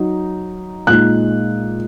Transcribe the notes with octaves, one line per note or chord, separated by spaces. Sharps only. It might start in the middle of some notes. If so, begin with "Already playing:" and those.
Already playing: F#3 D#4
A#2 G#3 D#4 F#6